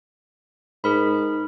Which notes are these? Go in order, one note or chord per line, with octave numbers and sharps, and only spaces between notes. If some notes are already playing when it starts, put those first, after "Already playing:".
G#2 G#4 A#4 B5